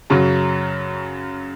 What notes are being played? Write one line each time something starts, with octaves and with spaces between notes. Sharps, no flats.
F#2 C#3 F#3